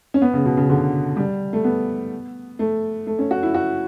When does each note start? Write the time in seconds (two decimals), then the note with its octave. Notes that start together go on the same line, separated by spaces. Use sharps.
0.14 C#4
0.22 B3
0.34 C#3
0.45 B2
0.57 C#3
0.70 D3
1.16 G3
1.53 A3
1.64 B3
2.59 A3
3.07 A3
3.19 C#4
3.31 F#4
3.43 E4
3.54 F#4